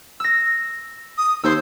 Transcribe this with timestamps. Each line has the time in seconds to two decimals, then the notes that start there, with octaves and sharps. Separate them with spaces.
0.20 E6 A#6
1.18 D#6
1.44 D#2 C5 E6 G#6